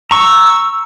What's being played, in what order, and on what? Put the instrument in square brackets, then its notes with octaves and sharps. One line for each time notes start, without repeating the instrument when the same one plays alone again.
[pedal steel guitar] A#5 C#6 [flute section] E6